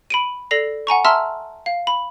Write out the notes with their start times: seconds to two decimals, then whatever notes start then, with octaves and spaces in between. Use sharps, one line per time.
0.10 B5 D7 D#7
0.51 A4 D5 A#6 C7 F7
0.87 F#5 G#5 A#5 C#6
1.05 E5 A5 A#5 C6 E6 F6
1.66 F5
1.87 B5